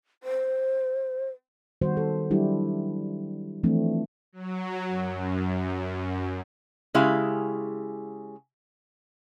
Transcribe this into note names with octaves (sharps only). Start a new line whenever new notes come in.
C5
D#3 G3 B3 F#4 C5
A4
F#3 G3 D4 E4 G4
E3 F3 A3 C4 D4
F#3
F#2
C#3 G#3 E4 G4 F5